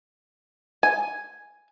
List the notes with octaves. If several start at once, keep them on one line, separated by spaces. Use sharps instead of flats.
G#5